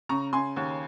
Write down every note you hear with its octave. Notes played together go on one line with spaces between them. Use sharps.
C#3 A#5 C#6
C#3 G#5 C6
D#2